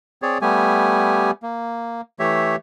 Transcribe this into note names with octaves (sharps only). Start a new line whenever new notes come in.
C4 G#4 C#5 D5
G3 A3 B3 G4 G#5
A#3
E3 A3 G4 C#5 E5